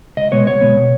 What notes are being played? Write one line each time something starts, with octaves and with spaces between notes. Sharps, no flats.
C#2 D#5
B2 G#3 B3 C#5
C#2 C#5
B2 G#3 B3
B2